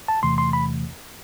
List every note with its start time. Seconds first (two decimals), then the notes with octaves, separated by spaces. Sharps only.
0.08 A5
0.23 E2 C3 E3 A3 C6
0.38 C6
0.53 B5